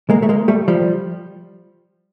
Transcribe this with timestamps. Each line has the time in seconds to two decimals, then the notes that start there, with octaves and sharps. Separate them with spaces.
0.10 G#3 A#3
0.22 A3
0.29 G#3 A#3
0.48 G3 A3
0.68 F3 G3